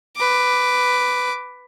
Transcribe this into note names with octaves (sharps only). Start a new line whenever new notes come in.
B4 D6